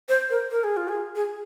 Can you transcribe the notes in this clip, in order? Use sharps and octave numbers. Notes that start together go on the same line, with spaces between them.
C5
A#4
A#4
G#4
F4
G#4
G#4